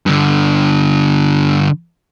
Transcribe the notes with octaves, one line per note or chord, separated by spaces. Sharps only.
G2 D3